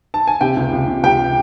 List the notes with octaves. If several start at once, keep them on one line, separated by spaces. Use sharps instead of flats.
A5
G#5
C3 G4 G5
C#2
C#2
C3
C#2 G4 G5